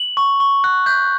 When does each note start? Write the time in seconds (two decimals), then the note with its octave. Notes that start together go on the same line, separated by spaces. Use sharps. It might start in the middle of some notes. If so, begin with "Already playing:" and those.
Already playing: F#7
0.17 C#6
0.40 C#6
0.64 F#6
0.86 G6